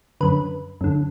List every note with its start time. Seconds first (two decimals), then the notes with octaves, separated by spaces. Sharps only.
0.21 F#2 D3 B4
0.81 F#2 D3